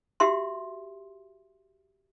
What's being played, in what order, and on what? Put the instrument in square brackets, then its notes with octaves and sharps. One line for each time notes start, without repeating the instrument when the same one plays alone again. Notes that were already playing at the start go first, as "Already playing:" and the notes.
[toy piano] F#4 G4 E5 C6